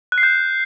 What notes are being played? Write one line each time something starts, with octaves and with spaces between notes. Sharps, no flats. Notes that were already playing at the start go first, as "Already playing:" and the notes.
F#6
C7
G6